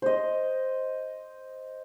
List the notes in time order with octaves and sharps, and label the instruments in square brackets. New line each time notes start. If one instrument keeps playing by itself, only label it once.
[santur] C5 D#5